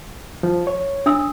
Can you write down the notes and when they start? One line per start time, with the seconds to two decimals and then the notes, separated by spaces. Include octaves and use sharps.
0.43 F3
0.67 C#5
1.06 D4 D#6 E6